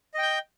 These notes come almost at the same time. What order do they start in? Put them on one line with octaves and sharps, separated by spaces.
D#5 G5 G6